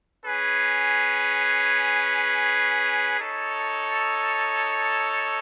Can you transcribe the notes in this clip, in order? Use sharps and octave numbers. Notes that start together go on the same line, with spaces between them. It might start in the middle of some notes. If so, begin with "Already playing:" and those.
C#4 G#4 B4
D#4 A4 C#5